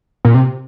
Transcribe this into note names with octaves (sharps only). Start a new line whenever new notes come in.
A#2
C3